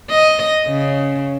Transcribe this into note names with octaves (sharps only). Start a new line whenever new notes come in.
D#5
C#3